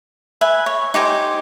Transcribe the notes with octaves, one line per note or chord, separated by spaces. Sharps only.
B4 E5 G#5
C#5
D#4 G4 C5 G#5